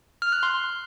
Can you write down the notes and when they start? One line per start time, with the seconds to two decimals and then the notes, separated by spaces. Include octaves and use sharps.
0.22 F6
0.32 F#6
0.43 C6